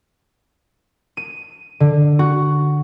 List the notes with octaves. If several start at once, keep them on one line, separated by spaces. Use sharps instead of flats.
D#7
D3
F#4